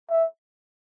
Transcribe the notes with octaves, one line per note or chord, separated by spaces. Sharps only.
E5